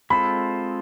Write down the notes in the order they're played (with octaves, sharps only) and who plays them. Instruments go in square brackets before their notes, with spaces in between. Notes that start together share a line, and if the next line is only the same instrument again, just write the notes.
[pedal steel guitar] G#3 C4 F4 A4 [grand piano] B5